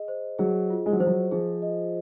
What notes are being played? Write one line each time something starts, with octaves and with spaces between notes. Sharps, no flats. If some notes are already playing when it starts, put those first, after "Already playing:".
Already playing: G#4 D#5
C5
F#3 G#4
F4
G#3
F#3
F3 C5
F#3
F3 G#4
D#5